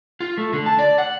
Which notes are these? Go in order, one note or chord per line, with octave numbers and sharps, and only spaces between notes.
F4
A3
D3
A5
D5
F#5